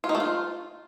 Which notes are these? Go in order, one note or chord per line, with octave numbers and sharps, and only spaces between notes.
F4
D#4
A3
F4